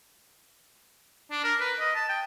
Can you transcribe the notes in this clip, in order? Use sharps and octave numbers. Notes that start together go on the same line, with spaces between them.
D4
A#4
B4
D#5
A5
G5